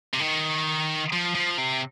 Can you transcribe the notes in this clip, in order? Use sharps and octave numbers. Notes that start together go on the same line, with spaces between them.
C3
D#3
F3
F3
C3